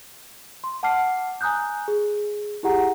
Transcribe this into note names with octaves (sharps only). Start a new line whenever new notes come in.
C6
F#5 A5 D6 F6 C7
G#5 A#5 D#6 F#6 G6
G#4
E4 G4 G#4 F#5 A#5